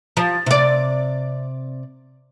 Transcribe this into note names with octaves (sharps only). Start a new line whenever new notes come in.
F3
C3 D5